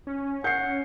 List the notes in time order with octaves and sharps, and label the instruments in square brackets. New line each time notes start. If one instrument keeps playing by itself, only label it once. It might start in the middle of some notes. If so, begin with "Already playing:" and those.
[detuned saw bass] C#4
[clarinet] F#5 [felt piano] G6 C7